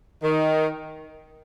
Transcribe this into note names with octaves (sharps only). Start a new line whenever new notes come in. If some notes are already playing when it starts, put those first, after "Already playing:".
D#3